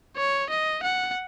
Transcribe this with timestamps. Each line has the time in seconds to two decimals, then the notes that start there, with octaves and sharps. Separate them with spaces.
0.17 C#5
0.50 D#5
0.83 F#5